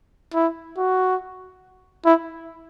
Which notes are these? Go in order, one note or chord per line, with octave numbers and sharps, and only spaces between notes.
E4
F#4
E4